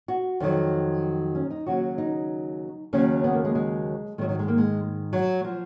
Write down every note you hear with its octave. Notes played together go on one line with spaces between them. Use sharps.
F#4
F2 D#3 F#3
C#4
D#4
D#2 C#3 F#3 F#4
D#4
D#2 C#3 F#3 C#4
B3
A#3
G#3
G#3
G#2 D#3 F#3 G#3
F#3
G#3
A#3
G#3
F#3
F3